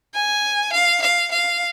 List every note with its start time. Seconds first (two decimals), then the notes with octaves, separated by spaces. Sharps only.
0.15 G#5
0.73 F5
1.02 F5
1.32 F5